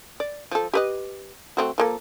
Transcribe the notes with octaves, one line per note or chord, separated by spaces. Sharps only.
D5
F3 A4
G4 B4 D#5
A3 C4 F#4
F3 A#3 A4